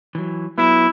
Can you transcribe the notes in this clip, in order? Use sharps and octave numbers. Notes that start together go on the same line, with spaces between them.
E3 F#3
F#3 B3 E4